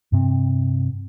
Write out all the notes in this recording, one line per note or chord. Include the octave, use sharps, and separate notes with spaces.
G2 C3 C4